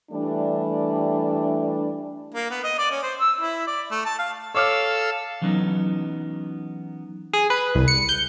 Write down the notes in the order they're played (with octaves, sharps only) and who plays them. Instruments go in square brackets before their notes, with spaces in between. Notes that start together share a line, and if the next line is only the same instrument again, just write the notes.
[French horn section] E3 G3 A3 D4
[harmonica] A#3
B3
D#5
D5
C#4
C5
E6
E4
D5
A3
A5
F5
[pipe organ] A4 F5 E6 [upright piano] C#5 D6 F6
[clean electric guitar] E3 F#3 B3 C#4 D#4
[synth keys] G#4
B4
C2
C#7
G6